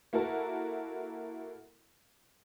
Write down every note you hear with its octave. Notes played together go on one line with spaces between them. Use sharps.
A#3 E4 F#4 A4 A#4